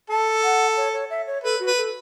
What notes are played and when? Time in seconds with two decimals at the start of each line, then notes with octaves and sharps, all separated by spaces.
0.09 A4 A5
0.44 F#5
0.77 C#5
0.93 C#5
1.10 E5
1.27 C#5
1.44 A4 B4
1.60 F#4
1.66 B4
1.77 A4